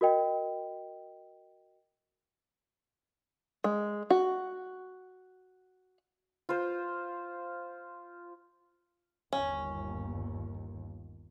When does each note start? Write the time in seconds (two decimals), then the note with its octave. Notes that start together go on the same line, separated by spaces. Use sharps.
0.01 F#4 A#4 D#5 G5
3.64 G#3
4.10 F#4
6.49 F4 C5
9.33 G1 D#2 C#4